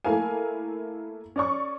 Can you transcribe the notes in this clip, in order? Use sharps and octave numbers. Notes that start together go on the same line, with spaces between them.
A3 A#3 E4 A#4 F5 G#5
C#4 D5 C#6